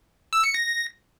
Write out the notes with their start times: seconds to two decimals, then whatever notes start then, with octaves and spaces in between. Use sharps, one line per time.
0.33 E6
0.44 C#7
0.54 A#6